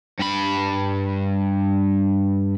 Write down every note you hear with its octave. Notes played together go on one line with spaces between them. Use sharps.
G2 B5